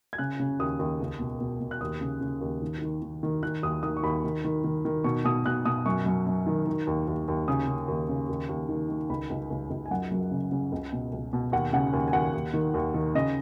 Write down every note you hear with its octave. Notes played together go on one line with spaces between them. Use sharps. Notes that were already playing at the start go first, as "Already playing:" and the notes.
G#6
C#3 F#6
C#3
D#2 D#6
D#2
C#2
B2
B2
B2
F#6
D#2 D#6
C#3
C#3
D#2
D#3
D#3
D#3
D#3
D#3 F#6
D#2 D#6
D#3 D#6
C#6
D#2 B5
D#3
D#3
D#3
D#3
B2 C#6
B2 D#6
B2 F#6
B2 D#6
F#2 C#6
F#2
F#2
D#3
D#3
D#2
D#2
D#2
C#3 D#6
C#3
D#2
C#3
D#2
D#2
D#3
D#3
C#2 B5
C#2
C#2
C#2
G#5
F#2 F#5
F#2
C#3
C#3
C#2
B2
C#2
B2
D#2 F#5
C#3 F#5
D#2 G#5
G#5
D#2 F#5
D#2
D#3
D#2
D#3
C#3 D#5